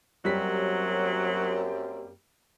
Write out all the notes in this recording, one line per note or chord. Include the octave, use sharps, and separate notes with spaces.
F#2 F#3 G3 A#3 C4 G4 B6